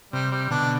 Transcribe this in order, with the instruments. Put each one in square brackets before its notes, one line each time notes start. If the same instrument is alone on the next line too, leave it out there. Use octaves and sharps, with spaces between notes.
[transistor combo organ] C3 [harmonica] G3
[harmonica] G3
[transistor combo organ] B2 D3 [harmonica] D4